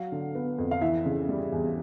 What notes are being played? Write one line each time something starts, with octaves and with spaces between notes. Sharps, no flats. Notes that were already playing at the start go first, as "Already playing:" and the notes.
Already playing: F#3 F5
D3
B3
F2
F5
E3 E5
C#3
G3
E2